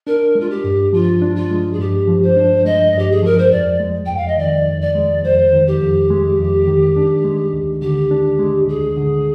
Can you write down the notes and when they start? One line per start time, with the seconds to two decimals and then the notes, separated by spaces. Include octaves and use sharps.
0.07 D4 A#4
0.35 G#3 F4
0.50 G4
0.64 G2
0.93 F3 F4
1.22 D4
1.35 F4
1.50 G#3
1.73 G#4
1.79 G2 G4
2.07 F3
2.23 C5
2.37 D4
2.65 G#3 D#5
2.94 G2 G4
3.11 G#4
3.23 F3 A#4
3.38 C5
3.51 F2 D5
3.80 G#3
4.05 F2 G5
4.17 F5
4.27 D#5
4.38 D#3 D5
4.66 F2
4.81 D5
4.95 G#3
5.24 F2 C5
5.53 D#3
5.67 G4
5.81 F2
6.10 G#3
6.38 F2
6.67 D#3
6.96 D4
7.24 G#3
7.53 D2
7.82 D3 G4
8.11 D4
8.39 G#3
8.68 D2 G#4
8.97 D3